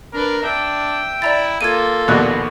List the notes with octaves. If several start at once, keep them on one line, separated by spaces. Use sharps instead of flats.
D4 A#4 B4
D4 E5 G5
E4 D5 A#5 A6
A#3 F4 A4 G#6 D#7
A#1 D#2 B2 B3 D5 F#6